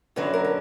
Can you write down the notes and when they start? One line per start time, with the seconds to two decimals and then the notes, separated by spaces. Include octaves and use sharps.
0.16 F#2 D3 F#3 B4
0.34 A#4
0.44 A4